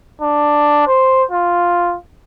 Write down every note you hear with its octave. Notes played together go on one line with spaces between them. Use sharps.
D4
C5
F4